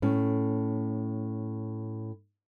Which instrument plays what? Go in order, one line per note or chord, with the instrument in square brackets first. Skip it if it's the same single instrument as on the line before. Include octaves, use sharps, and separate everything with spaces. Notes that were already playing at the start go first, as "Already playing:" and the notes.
[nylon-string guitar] A2 C#4